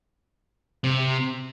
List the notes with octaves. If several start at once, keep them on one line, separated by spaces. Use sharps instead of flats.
C3